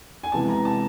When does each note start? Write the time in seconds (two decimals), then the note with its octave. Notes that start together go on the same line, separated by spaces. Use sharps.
0.24 G#5
0.32 C3 E3 G#3 B3 A5
0.49 A#5
0.65 A5